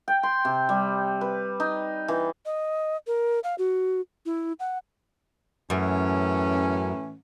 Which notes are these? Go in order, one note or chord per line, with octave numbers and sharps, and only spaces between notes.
G5
C6
C3
G3
B4
D#4
E3
D#5
A#4
F5
F#4
E4
F#5
F#2 A2 E3 C#4